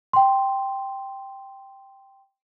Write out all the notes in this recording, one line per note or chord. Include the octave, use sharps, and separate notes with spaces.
G5 C6